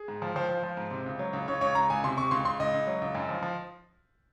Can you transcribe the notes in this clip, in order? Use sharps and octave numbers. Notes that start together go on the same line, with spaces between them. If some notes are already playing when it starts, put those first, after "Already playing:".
Already playing: G#4
G#2
F3
F3 C5
F3
F3
G#2
C3
C#2
F#3
C#2
C#2 C#5
C#2 C#5
C#2 A#5
C#2 G#5
C3 C6
C3 C#6
C#2 C6
C#2 C6
C#2 D#5
C#2
F#3
C#2
F#2
F3
F3